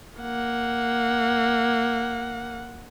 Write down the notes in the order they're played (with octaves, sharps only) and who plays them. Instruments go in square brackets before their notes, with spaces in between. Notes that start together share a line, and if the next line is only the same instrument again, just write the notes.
[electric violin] A#3 F#5